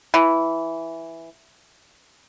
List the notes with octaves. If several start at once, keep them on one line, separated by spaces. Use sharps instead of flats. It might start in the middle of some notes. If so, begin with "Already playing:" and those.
E3